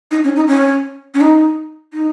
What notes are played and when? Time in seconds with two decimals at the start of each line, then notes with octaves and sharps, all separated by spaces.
0.11 D#4
0.23 C#4
0.35 D#4
0.47 C#4
1.14 C#4
1.20 D#4
1.93 D#4